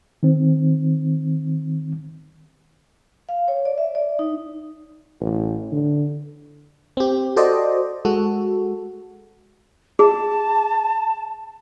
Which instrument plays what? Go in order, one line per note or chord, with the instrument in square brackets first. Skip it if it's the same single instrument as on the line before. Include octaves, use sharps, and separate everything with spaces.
[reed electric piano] D#3 C4
[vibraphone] F5
C#5
D5
E5
D5
D#4
[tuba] A1
D3
[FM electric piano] C4 G4
F#4 A4 C5 D5 D#5
G#3 F#4 A4
[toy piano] G#4 [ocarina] A5